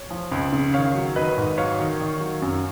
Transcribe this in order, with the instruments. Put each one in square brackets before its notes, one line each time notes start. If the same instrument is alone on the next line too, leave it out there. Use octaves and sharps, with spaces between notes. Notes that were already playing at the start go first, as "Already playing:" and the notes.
Already playing: [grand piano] C#5
F3
C#2
C#3
D#3 C#5 F5
F#3
D#3 B4 D#5
G#2
F#3 C#5 F5
D#3
D#3
F#3
F#2